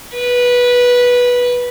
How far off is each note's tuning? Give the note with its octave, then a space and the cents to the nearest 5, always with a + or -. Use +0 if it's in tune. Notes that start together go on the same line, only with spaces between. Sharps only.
B4 -15